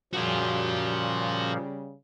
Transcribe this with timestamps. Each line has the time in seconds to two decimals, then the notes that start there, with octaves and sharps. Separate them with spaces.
0.13 A#2 C#3 F3 G3 F#4 G#5